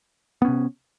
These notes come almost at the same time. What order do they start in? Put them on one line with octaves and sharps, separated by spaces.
B3 C#4 C3